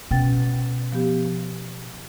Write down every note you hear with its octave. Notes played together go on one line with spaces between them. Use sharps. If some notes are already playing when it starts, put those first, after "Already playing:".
B2 C#4 G5 A6
F3 B3 G4